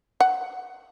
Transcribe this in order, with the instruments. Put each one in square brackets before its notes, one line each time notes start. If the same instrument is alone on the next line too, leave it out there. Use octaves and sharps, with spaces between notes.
[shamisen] F#5